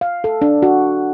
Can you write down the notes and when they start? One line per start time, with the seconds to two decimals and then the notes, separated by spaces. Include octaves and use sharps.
0.01 F5
0.24 A4
0.42 D4
0.62 F#4